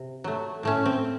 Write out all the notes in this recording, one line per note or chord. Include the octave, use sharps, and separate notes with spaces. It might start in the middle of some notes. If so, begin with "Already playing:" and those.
Already playing: C3 C4
F#3 A3
A2 A3 C#4
C4